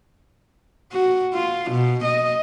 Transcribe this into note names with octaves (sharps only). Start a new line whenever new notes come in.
F#4
F4
B2
D#5